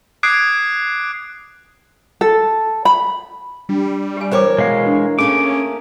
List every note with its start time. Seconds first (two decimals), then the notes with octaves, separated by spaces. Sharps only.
0.23 D6 D#6 F#6 G#6 C7 D7
2.21 A4
2.85 B5
3.69 G3 D4
4.17 G4 G#5
4.32 E3 A#4 C5 C#5 G5 D6
4.58 B2 G#3 F5
4.86 D4
5.19 A3 A#3 C#4 G#4 D6